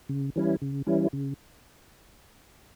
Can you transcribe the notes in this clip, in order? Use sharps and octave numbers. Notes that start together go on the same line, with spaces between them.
C#3
E3 G3 C#4 E4
C#3
E3 G3 C#4 E4
C#3